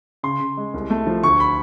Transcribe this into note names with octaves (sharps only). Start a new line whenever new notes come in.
C#3 C6
C#3
G#3
C2
A3
F3
D2 C#6
B5